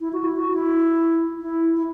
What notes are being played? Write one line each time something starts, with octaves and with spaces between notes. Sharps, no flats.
E4
F#4
E4
F#4
E4
E4
E4